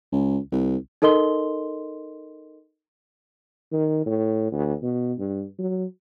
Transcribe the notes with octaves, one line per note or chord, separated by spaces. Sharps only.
C#2
C2
D#4 A4 A#4 D#5 C6 G7
D#3
A2
D2
B2
G2
F#3